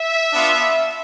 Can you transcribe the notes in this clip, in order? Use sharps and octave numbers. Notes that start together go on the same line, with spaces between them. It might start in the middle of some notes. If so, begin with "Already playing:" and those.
Already playing: E5
B3 D4 F4